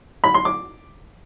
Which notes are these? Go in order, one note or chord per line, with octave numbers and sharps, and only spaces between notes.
B5
C6
D6